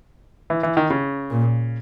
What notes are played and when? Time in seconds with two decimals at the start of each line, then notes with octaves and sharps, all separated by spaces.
0.50 E3
0.63 E3
0.77 D#3
0.90 C#3
1.30 A#2